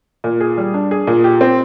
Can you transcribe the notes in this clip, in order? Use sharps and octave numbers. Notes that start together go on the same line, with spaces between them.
A#2
G#4
G3
D4
G#4
A#2
G4
C4